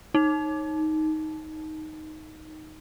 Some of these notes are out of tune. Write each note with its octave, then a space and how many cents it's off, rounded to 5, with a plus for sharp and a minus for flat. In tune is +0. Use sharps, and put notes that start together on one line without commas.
D#4 +5